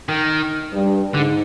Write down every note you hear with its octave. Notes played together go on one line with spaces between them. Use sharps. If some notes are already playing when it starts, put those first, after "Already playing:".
D#3
G2
G#2 D3